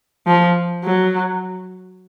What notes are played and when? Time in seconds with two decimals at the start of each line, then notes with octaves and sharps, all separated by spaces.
0.27 F3
0.84 F#3